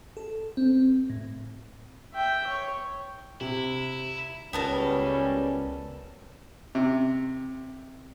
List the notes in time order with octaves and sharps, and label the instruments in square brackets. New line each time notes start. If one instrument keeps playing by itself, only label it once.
[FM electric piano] A4
C4
A2
[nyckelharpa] E5 G5
C#5
[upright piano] C3 [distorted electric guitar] E4
[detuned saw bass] C#2 [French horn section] G3 C#4 [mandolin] B3 A4 A#4
[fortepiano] C3